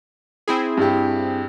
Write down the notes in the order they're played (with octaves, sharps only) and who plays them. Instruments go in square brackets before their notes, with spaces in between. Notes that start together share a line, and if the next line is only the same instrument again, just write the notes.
[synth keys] C4 E4 G#4
[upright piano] G2 G4